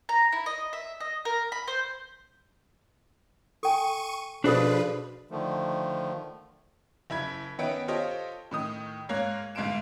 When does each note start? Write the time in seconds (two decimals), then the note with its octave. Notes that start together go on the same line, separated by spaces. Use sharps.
0.09 A#5
0.32 E4
0.46 D#5
0.73 E5
1.00 D#5
1.25 A#4
1.52 B5
1.68 C5
3.63 A4 G5 G#5 C#6 D#7
4.44 B2 F3 D4 G#4 A4 B4 C5 D5
5.31 D3 D#3 F3 A3
7.10 F#1 E4 B5 G#6 B6
7.59 D#3 B3 C#4 E5 D7
7.88 F4 G4 A4 C5 C#5 D#5
8.51 A2 D#3 D#6
9.09 G#2 A#3 C#5 F5 F#6 G#6
9.55 G1 G#2 F5 C6 D7 E7